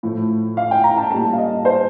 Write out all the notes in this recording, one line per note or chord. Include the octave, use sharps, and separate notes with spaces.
A2 F3 A3
F5
G5
A#5
A5
A#2 G3 A#3 A5
F5
D#5
C5